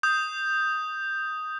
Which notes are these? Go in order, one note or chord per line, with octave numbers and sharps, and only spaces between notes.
D#6 G6